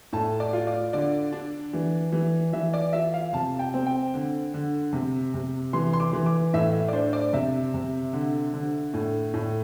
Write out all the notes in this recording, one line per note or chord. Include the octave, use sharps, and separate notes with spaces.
A2 A5
D5
F4
D5
D3 D5
D4
E3
E3
E3 E5
D5
F4 E5
F5
C3 A5
G5
C4
G5
D3
D3
C3
C3
E3 C6
C6
D6
E3
D6
A2 E5
E5
D5
D4 C5
D5
C3 E5
C3
D3
D3
A2
A2